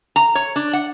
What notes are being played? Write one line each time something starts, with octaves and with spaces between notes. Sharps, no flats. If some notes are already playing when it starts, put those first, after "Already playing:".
A#5
C#5
D4
F#5